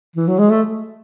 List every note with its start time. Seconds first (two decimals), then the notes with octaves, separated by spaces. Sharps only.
0.16 E3
0.28 F#3
0.39 G#3
0.50 A3